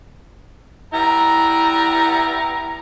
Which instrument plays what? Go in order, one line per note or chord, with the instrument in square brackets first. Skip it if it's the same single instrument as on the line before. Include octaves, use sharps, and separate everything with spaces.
[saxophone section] G3 B3 E4 [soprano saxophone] A#5